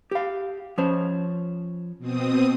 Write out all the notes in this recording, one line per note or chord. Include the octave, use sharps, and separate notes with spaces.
G4 F5
F3 C#4 C5
B2 C4 D#6